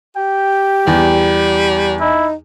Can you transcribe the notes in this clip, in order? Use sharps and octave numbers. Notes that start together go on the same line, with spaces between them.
G4 G5
E2 G3
D#4 E4